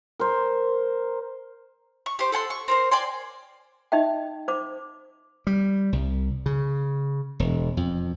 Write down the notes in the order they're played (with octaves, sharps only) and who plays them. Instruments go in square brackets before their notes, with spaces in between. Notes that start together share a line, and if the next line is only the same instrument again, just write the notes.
[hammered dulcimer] A#4 C5
[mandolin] C#6
G4 C5
A4 F#5 G#5 C6
C#6
C4 A#4 C5
D5 G5 G#5 C6
[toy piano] D#4 D#5 E5 G5
C5 D6
[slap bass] G3
C2
C#3
E1
F2